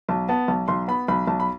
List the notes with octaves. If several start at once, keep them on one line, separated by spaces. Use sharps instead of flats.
B1 A5
B3 A5
B1 A5
B1 C6
B3 B5
B1 B5
B1 A5
B5